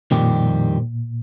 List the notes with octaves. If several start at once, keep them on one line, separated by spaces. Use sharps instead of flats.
F2 A#2 D#3 G3 C4 G4